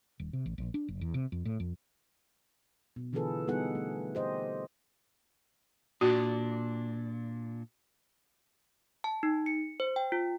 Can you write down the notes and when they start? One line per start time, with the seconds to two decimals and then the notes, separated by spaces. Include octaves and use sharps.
0.20 D#1
0.33 C3
0.46 A1
0.58 A#1
0.74 D4
0.88 F#1
1.01 E2
1.14 C3
1.32 F2
1.45 A2
1.60 F2
2.96 B2
3.13 D3 E3 F4 G#4 A4 B4
3.47 G3 B3 D#4 G#4 A4 F#5
3.75 A3
4.15 G4 C5 D#5
6.01 A#2 D4 F#4
9.04 A5
9.23 D#4
9.46 C#7
9.80 C5
9.96 G5
10.12 F4